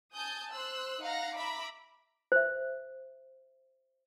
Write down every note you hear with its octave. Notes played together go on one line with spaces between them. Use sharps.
G#5 A5 D#6 G6
C5 E6 F#6
D#4 F5 F#5 A#5 A#6
E5 A#5 B5 D6
C5 E5